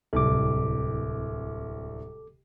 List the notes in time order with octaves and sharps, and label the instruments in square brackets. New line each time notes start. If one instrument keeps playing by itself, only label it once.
[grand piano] D1 C2 [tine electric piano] A4 D6